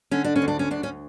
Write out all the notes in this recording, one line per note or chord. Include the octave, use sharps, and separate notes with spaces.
D3 C#4
D4
C#4
D2
D4
C#4
D2 D4
C#4